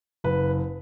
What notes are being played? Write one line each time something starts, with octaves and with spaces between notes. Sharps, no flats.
F#1 B4